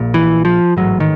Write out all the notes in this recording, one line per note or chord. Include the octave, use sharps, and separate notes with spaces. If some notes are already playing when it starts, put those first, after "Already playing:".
Already playing: A#1 A#2
E3
F3
A1 G#2 F#3
D#3